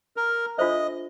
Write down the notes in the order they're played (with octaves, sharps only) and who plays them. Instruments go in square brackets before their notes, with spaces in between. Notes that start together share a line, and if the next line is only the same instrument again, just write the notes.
[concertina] A#4
[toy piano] D4 F4 A4 C5 E5 [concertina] D#5